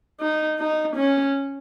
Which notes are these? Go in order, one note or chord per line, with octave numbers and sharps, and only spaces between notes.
D#4
D#4
C#4